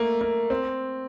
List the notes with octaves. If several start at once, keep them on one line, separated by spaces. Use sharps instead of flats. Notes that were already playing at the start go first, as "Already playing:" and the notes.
Already playing: A3 A#3
A#3
C4